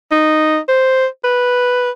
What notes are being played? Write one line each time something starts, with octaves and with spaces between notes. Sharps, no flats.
D#4
C5
B4